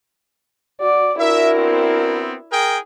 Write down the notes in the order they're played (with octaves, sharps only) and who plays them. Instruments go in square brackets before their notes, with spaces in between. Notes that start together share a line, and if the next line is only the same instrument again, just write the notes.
[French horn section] F#4 [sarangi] D5
[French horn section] D4 F#4 A#4 [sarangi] E4 [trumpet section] E5
[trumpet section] B3 C4
G#4 A#4 G5